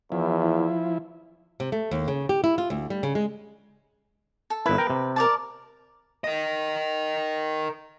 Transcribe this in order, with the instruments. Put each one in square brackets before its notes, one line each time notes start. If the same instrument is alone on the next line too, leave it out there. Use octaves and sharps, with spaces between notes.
[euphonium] E2 [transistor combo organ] F3 E4
[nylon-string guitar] C3
A3
D#2
C#3
G4
E4
F4
D2
G3
C#3
G#3
[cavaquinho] A4
[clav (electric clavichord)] G1 E4 [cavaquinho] B4
[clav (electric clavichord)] A#4 G5
C3
[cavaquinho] A#4 D5 A5
[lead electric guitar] A#4 D#5